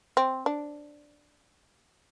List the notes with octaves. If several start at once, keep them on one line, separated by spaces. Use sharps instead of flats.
C4
D4